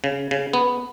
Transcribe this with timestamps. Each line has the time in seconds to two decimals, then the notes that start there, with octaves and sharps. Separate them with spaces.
0.04 C#3
0.31 C#3
0.53 B3